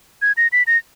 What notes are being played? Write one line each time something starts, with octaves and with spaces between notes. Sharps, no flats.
G#6
A#6
B6
A#6